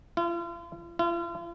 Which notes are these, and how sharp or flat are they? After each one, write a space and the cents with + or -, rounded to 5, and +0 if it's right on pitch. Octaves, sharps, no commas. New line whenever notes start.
F4 -40
F4 -40